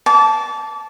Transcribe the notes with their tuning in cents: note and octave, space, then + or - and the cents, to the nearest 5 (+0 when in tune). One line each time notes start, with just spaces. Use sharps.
A5 -15 D6 -30